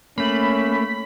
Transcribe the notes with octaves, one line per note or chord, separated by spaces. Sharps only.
A3 A#3 C#4 B5